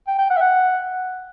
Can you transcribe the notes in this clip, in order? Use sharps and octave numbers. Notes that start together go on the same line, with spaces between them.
G5
G5
F#5
E5
F#5